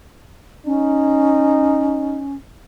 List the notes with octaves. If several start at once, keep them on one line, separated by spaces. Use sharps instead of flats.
C#4 D#4